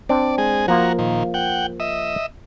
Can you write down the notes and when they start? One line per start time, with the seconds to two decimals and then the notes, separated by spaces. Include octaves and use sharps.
0.09 C4 D4 D5
0.38 G#3 G#4
0.68 F3 A#3 F4 F#4 A#4
0.99 A#2 D#3
1.34 F#5 G5
1.80 D#5 E5